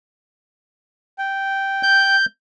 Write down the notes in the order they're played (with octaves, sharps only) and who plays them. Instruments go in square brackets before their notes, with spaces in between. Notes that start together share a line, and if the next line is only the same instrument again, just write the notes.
[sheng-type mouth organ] G5
[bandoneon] G6